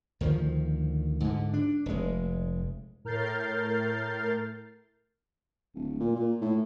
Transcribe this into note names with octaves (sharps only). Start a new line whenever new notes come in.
D2 D#3 F3
G#2 D3
D4
F1 G#3
A2 A#4 F6 G6 A6 C7
D1
A#2
A#2
A2